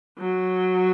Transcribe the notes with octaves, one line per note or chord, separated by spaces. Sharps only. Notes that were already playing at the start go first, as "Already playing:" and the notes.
F#3